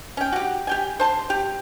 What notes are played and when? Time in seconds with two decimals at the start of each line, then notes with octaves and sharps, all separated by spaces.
0.17 C#4 G5
0.33 F#4 G4
0.67 G4 G5 G#5
1.00 C5 A5 C6
1.30 G4